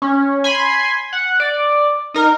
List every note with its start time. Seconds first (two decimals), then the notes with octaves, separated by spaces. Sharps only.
0.02 C#4
0.44 G#5 B5 C6
1.13 F#5
1.40 D5
2.14 D#4 A#4